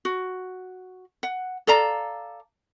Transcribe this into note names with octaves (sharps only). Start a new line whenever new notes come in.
F#4
F#5
A4 D5 F5 A#5